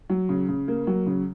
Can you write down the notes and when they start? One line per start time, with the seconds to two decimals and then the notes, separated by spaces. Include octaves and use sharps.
0.10 F#3
0.29 C#3
0.49 C#3
0.68 A#3
0.87 F#3
1.06 C#3